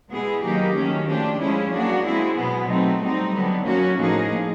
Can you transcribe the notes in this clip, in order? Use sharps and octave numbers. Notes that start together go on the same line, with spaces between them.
B2 G#3 B3 E4 G#4
D#3 F#3 A#3 D#4 G4
D#3 F#3 A3 C#4
F3 A3 D4 G4
F3 G#3 C#4 E4 G#4
F#3 A#3 D4 F#4
G#3 C4 E4 G#4
B2 F#3 B3
F#3 A3 C4 D#4
G3 C4 D#4
D3 F#3 B3
F#3 A#3 C#4 F#4
A2 F3 A#3 D#4 G#4